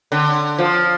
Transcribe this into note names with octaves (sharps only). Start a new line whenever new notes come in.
D3
F3